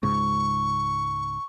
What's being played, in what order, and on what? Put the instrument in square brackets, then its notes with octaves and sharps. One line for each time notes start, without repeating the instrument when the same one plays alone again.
[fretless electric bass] C#2 G#2 [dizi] C#6